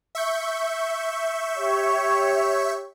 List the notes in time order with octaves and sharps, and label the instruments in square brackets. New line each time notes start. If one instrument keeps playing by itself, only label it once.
[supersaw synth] E5 C#6 G6
[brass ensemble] G4 C#5